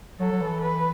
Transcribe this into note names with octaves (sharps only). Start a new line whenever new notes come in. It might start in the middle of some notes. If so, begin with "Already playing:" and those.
F#3 A4
F#3
E3
B4